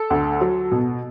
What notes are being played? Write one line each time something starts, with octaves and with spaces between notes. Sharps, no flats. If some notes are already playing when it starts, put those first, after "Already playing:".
Already playing: A4
D2
F#3
B2